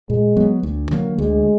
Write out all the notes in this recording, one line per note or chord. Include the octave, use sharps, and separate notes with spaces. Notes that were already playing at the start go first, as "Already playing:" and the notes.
A#2 G#3
F#3 B3
D2
D3 F#3 A#3
D2 G#3